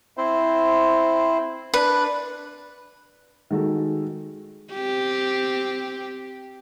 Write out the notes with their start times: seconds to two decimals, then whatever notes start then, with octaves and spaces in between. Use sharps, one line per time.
0.17 C4 E4 C5
1.74 D4 B4
3.51 D#3 G#3 F#4 A4
4.74 C4 G4